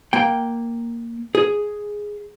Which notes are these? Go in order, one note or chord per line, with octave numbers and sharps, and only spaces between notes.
A#3 G5
G#4